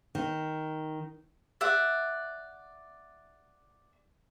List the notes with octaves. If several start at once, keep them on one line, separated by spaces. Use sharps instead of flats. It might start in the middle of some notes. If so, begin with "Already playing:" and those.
D#3
D5 E5 F#5